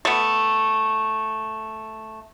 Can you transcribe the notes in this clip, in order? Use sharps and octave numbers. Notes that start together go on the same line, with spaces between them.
A3 B3